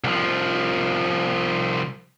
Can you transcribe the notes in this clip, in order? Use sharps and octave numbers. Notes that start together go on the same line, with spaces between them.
C2 F3